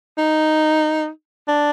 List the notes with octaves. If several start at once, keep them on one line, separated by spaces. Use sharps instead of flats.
D#4
D4